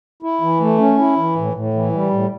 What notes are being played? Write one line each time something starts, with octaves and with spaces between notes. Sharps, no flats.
E4
E3
A3
C#4
E4
E3
A2
A2
E3
G3
A2